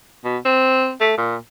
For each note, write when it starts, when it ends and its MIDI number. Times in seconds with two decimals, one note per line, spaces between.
0.24 0.38 47
0.45 0.91 60
1.01 1.16 57
1.17 1.36 46